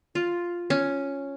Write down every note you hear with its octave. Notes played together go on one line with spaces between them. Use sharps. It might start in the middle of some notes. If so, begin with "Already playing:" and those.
F4
C#4